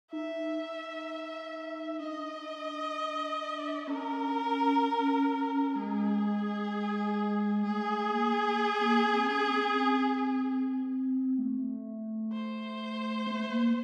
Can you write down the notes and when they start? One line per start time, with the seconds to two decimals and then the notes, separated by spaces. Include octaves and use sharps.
0.12 D#4 E5
2.00 D4 D#5
3.87 C#4 A#4
5.75 G#3 G#4
7.63 A3 G#4
8.10 A#3
8.81 A#3
9.04 C4
9.28 C#4
9.51 C4
11.38 A3
12.32 C5
13.27 A3
13.50 A#3